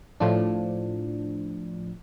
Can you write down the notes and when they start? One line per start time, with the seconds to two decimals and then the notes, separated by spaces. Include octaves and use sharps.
0.20 A2 F3 D4